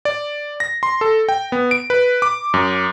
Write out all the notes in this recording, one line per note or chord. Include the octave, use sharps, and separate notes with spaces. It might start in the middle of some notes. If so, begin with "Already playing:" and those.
D5
A#6
C6
A4
G5
B3
D7
B4
D6
F#2